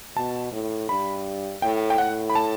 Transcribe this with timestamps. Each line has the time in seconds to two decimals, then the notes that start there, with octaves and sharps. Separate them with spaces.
0.17 B2 A5
0.52 A2
0.89 G2 B5
1.62 A2 G5
1.90 G5
1.98 A2 F#5
2.30 B5
2.35 A5